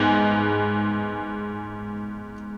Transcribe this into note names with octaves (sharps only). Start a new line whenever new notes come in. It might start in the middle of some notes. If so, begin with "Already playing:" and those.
Already playing: G#2 G#3 B3 F#6